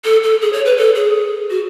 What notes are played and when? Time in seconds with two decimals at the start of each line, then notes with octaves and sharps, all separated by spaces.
0.05 A4
0.23 A4
0.42 G#4
0.53 C#5
0.65 B4
0.77 A4
0.95 G#4
1.50 F#4